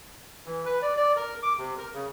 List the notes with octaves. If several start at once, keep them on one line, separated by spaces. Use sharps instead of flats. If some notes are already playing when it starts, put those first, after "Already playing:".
E3
B4
D5
D5
A#4
D6
C3
A#4
C#3